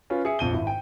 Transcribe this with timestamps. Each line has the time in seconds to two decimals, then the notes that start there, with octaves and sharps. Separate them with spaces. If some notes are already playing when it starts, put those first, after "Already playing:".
0.10 C#4 F4 B4
0.25 G#4 E5 C#7
0.39 A#1 F2 D#7 G7
0.53 G#1 E4
0.67 G5